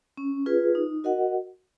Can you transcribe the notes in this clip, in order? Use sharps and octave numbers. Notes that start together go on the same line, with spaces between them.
C#4
F4 G#4 B4
D#4
F#4 A#4 D#5 F#5